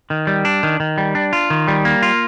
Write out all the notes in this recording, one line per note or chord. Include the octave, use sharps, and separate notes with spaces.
D#3
G3
D4
D#3
D#3
G3
D4
F4
D#3
G3
A#3
F4